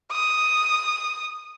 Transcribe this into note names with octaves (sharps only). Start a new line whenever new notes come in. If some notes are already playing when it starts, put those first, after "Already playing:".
D#6